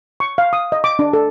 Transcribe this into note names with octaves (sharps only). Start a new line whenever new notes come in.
C#6
F5
D#6
D#5
D6
D4
A4